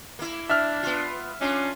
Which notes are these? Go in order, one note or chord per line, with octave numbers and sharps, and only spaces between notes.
A#3 E4
D4 E5 F6
B3 F4
C#4 D4 F4